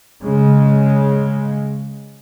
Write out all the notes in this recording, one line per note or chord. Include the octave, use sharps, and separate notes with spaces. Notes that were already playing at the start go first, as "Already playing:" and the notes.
C#3 G#3